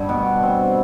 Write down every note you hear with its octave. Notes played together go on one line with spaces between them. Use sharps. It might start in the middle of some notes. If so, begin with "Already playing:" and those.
Already playing: G2 D3 G3
B2
C4